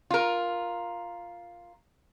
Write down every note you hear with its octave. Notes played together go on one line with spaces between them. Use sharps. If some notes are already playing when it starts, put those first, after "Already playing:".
F4 A#4